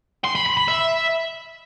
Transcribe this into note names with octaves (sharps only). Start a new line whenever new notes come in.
C6
B5
B5
B5
E5